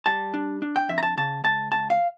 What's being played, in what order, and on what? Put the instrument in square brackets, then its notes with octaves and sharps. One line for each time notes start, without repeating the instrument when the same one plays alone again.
[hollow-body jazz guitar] G3 A5
D4
D4
G5
F2 E5
A#5
A5
C#3 A5
C#2 A5
C#2 A5
F5